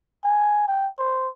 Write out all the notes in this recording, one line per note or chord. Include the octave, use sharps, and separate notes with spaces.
G#5
G5
C5